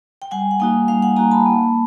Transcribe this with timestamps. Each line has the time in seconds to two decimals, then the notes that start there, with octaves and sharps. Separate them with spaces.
0.22 G5
0.31 G3 F#5 G#5
0.51 F#5
0.60 A#3 D#4 F#4 F5 G5
0.88 G3 F5 G5
1.02 F#5 G#5
1.16 A#3 D#4 F#4 G#5 A#5
1.31 A5 B5
1.46 A#3